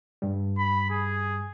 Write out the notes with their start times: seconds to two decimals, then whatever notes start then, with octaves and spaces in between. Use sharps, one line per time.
0.22 G2 G3
0.58 B5
0.90 G#4